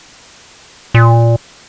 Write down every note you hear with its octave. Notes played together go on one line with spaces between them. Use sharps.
A#2